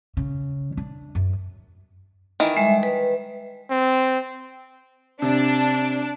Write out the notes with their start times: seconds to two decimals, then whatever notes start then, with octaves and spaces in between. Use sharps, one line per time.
0.17 C#3
0.77 D4
1.15 F#2
2.40 D#3 E3
2.56 G3 G#3 E5
2.83 B4
3.70 C4
5.22 C3 D4